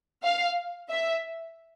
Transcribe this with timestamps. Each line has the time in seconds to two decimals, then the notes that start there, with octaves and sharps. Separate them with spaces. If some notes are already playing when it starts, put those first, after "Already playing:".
0.23 F5
0.90 E5